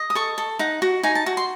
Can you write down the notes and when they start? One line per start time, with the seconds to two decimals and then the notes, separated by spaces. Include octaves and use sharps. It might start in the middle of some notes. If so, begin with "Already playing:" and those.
Already playing: D#5
0.10 D#6
0.15 A4 C#6
0.38 A4
0.59 D#4 F#5
0.82 F#4
1.03 D#4 G#5
1.15 A5
1.26 F#4
1.37 C6